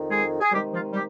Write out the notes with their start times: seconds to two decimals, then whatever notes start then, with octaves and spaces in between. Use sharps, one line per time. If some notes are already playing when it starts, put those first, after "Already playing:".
Already playing: F2 D#3
0.10 G#3 G#4
0.40 G#4
0.52 C3 D#3 G3 G#3 G4
0.72 F3 F4
0.93 G3 G4